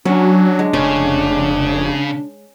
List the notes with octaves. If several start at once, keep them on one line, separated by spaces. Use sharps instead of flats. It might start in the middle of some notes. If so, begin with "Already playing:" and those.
F#3 C#4 D4
G#3
F1 C#3 C#4